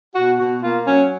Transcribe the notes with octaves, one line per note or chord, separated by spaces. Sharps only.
B2 F#4
B2 F#4
A#3 F4
F#3 C#4